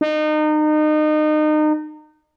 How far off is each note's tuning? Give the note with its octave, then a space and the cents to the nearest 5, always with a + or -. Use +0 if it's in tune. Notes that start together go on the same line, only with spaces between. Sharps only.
D#4 -30